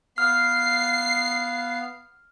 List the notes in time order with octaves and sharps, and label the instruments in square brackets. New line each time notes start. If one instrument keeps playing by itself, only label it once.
[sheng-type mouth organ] B3 F5 [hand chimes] F6 [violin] C7